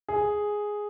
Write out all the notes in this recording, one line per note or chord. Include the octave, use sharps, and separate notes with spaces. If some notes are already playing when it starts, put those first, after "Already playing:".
G#4